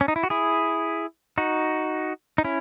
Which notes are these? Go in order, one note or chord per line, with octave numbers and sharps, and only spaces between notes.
C#4
D#4
E4
F#4
E4 G#4
D#4 F#4
D#4
C#4 E4